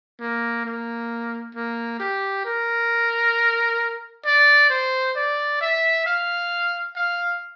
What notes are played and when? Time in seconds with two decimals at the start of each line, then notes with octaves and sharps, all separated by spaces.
0.20 A#3
0.65 A#3
1.55 A#3
2.00 G4
2.45 A#4
4.26 D5
4.70 C5
5.16 D5
5.61 E5
6.06 F5
6.96 F5